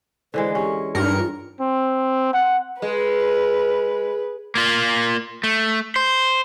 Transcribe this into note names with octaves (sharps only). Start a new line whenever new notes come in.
D3 E3 G#3 C5
C#4 G4
G2 D#4 A#4 C#7
F4
C4
F#5
G#3 B4
A#3 F4
A3
C5